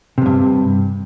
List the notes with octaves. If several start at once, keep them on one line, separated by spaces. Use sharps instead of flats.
E2 G2 C3